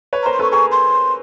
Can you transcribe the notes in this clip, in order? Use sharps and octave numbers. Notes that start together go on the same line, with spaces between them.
B4 C#5
A#5
A#4 C5
C6
A4 B4 C#6
G#4 A#4 C#6
C6